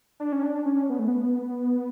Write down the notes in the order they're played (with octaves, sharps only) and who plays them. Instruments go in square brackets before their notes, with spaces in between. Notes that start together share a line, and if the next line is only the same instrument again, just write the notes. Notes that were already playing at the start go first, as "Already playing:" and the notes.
[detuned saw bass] D4
C#4
D4
C#4
B3
A3
B3